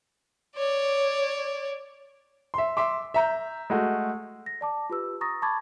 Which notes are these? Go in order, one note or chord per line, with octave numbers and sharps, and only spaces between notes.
C#5 D5
E5 C6
E5 C6 D6
E5 A#5 G6
G#3 A3 F#4
A#6
D5 A5 D6
F4 G4 B4 E6
A#5 C#6 D#6 A6 A#6
A5 B5 C#6 D6 G#6 A6